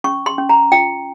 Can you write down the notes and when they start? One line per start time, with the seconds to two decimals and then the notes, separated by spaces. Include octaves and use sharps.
0.04 C#4 C#6
0.26 C6
0.38 C#4
0.49 A#5
0.72 F4 G5